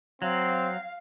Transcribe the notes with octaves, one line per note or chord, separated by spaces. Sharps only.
F#3 C4 F5